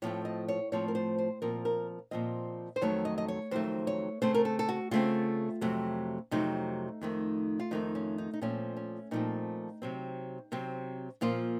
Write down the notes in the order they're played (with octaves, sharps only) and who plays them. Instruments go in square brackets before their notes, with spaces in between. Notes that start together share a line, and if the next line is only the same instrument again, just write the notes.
[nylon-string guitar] A2 F3 A3 C4 C#5
D#5
C#5
A2 F3 A3 C4 C#5
A#4
C5
C5
A#2 F3 C4 A#4
A#4
A#2 F3 C4 D#5
C5
F2 D#3 F#3 A3 C#5
D#5
D#5
C#5
F2 D#3 F#3 A3 C5
C#5
C#3 A3 C4 C5
A#4
A4
A4
F#4
C#3 A3 C4 F4
F2 C3 F#3 A3
F2 C3 F#3 A3 D#4
F2 D#3 A3
F4
F2 D#3 A3 D#4
C#4
D#4
D#4
A#2 F3 A3 C4 C#4
C#4
A#2 F3 A3 C4 D#4
C3 F#3 C4
C3 F#3 C4
A#2 F3 A#3 F4